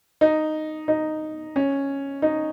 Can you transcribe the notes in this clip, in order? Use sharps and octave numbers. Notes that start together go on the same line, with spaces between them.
D#4
D#4
C#4
D#4